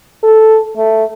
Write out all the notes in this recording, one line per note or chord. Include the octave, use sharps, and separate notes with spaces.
A4
A3